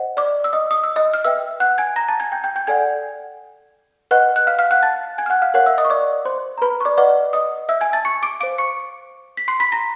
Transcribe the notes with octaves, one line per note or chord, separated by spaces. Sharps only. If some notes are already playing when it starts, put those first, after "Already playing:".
Already playing: C5 D#5 F#5
D5 D6
E6
D#5 D#6
D#6
E6
D#5 D#6
F6
B4 E5 G5 E6
F#5 F#6
G#5 G#6
A#5 A#6
A5 A6
G#5 G#6
G5 G6
G5 G6
G5 G6
A4 D5 F#5 G#5 G#6
B4 D#5 F#5 F#6
F#6
F5 F6
F5 F6
F#5 F#6
A5 A6
G#5 G#6
F6
F#5 F#6
F5 F6
A#4 C#5 F5 F#5 F#6
E5 E6
D#5 D#6
C#6
D5 D6
C5 C6
A#5
B4 B5
C#6
D5 D6
B4 D5 D#5 F#5 D6
D#5 D#6
E5 E6
G#5 G#6
A5 A6
C#6 C#7
D6 D7
C5 F5 D6 D7
C#6 C#7
B6
C6 C7
B5 B6
A#5 A#6